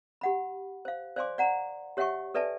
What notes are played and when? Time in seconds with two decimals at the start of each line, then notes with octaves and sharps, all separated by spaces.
0.21 G4 F#5 B5
0.85 C5 F5
1.16 C5 D5 F5 G#5 C6 D6
1.38 D5 F#5 A#5
1.97 G4 C#5 E5 F#5 G5 C#6
2.34 A4 B4 D5 E5 G#5 A5